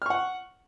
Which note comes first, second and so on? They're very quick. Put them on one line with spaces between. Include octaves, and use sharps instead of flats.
F6 C#6 F#5